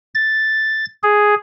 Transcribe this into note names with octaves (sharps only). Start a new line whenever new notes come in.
A6
G#4